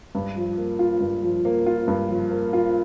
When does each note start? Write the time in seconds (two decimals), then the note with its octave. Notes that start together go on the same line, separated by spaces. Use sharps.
0.15 G2
0.36 F3
0.58 A#3
0.79 F4
1.00 G2
1.23 F3
1.45 A#3
1.66 F4
1.88 G2
2.09 F3
2.31 A#3
2.53 F4